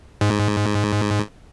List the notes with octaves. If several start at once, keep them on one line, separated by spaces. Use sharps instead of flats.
G#2